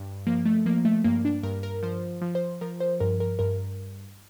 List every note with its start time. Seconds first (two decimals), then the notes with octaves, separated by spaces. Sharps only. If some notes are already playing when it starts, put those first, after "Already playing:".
Already playing: G2
0.27 F3 A#3
0.46 A3
0.66 F3 A#3
0.85 A3
1.04 G2 A#3
1.25 D4
1.43 G2 A#4
1.63 A#4
1.83 F3 C5
2.21 F3
2.35 C5
2.61 F3 A#4
2.80 C5
3.00 G2 A#4
3.20 A#4
3.39 G2 A#4